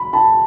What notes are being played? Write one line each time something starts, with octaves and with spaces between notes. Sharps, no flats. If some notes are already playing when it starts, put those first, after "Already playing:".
Already playing: B5
A5 B5